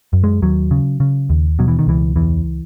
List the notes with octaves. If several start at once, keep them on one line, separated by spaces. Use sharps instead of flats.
F#2
G#3
D#2 F#3
C#3
C#3
D#2
B2 F#3
E3
D#3
C#2 E3
E2 E3